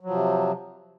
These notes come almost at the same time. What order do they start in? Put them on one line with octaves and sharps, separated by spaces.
F#3 F3 C3